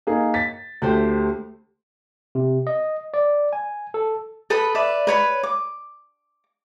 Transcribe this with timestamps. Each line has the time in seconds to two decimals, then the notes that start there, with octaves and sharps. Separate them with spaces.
0.07 A#3 D#4 G#4
0.34 A6 B6
0.82 D2 A3 G4 C5
2.35 C3
2.67 D#5
3.14 D5
3.53 G#5
3.94 A4
4.50 A4 B4 B5 D#6
4.75 B4 D5 E5
5.07 B4 C#5 B5
5.43 D6